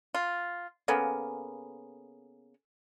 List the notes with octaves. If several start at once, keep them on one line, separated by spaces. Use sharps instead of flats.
F4
C#3 A#3 B3 A4 G#5